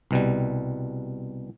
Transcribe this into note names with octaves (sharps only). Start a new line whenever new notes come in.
C2 B2 G3